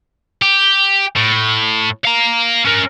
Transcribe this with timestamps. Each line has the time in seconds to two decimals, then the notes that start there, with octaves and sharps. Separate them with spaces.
0.42 G4
1.16 A2
2.05 F5 A#5
2.65 C#4 A#4